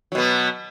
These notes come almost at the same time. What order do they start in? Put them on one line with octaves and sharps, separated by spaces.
F#3 B2 B3